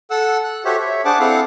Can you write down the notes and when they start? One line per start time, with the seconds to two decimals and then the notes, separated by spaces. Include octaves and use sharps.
0.11 A4 F#5 E6
0.44 F#6
0.65 F#4 G4 A4 C5 C#5 E5
0.80 C#5 E5
1.05 D4 G#4 C5 F#5 A5 D6
1.20 C4 E4 A4 F5 F#5